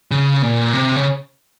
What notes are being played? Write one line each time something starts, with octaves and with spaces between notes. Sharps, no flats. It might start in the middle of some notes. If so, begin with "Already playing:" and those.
C#3
A#2
C3
C#3